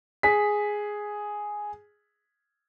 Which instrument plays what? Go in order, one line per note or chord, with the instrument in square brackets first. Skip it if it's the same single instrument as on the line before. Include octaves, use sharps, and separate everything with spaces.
[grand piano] G#4 B6